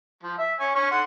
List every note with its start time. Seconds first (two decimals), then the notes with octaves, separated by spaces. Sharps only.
0.23 F3
0.38 E5
0.59 C#5 G#5
0.75 C#5 F6
0.91 F#5 C6